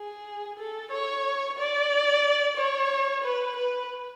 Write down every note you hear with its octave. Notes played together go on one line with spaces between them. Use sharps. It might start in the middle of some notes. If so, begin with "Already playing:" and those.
Already playing: G#4
A4
C#5
D5
C#5
B4
B4